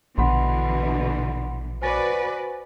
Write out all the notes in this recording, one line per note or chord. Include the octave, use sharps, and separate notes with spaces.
A#1 B2 D3 E3 F#5 B5 C6
F#4 B4 C5 D5 G#5 A6